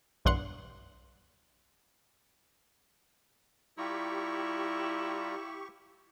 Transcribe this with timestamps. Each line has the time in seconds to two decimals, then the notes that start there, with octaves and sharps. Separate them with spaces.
0.25 B1 G2 E3 F#5 C6 C#7
3.78 G3 E4 F4 G4 A#5 C#6